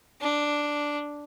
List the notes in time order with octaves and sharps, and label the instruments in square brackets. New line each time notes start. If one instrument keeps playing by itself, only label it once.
[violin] D4